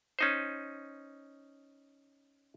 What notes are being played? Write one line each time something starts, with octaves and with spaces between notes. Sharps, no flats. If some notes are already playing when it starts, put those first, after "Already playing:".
C#4 D#4 C5